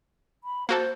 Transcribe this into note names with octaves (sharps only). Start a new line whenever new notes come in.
B5
A#3 F#4 A4 C5